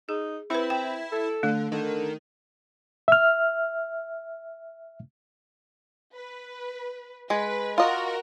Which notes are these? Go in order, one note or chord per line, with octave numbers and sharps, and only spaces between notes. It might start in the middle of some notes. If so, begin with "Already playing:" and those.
D#4 G#4
C4 E4 B4 E5
G5
A4
D3 A3
D3 D#3
E5 F6
B4
G#3 B4
F4 F#4 A#4 D#5